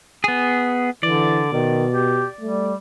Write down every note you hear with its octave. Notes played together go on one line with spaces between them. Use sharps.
B3 G#4
D3 E3 D5
B2 D#3
G4
G3 A3